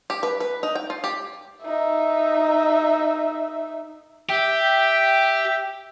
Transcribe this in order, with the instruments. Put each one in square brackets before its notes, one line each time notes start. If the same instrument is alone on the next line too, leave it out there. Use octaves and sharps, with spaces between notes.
[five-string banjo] G4
B4
B4
D#4
G5
F4
G4
[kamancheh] D#4 E5
[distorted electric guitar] G4 [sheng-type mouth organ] E5 G5